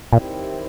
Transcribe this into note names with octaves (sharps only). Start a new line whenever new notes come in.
D#2 A#2 D#3 G3 C4 E4